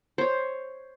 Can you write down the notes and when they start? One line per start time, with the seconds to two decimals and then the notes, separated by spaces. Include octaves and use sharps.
0.18 C5 C#5